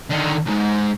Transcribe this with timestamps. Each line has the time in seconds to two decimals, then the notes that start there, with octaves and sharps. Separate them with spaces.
0.10 D3 D#3
0.46 C#2 G#2